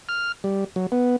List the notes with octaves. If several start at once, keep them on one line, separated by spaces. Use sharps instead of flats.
F6
G3
F#3
B3